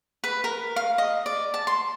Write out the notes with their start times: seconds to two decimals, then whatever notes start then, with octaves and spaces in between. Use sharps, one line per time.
0.24 B4
0.44 A#4
0.76 F5
0.98 D#5
1.26 D5
1.54 A5
1.67 C6